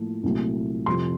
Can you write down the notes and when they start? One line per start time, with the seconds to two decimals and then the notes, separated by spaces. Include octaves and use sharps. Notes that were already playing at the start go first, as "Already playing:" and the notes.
Already playing: A2 F3 A#3
0.23 C2 A#2 F#3 A3
0.86 F2 C3 F3 C6